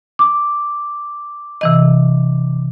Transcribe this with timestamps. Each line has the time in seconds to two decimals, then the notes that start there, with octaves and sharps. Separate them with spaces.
0.19 D6
1.61 C3 E3 D#5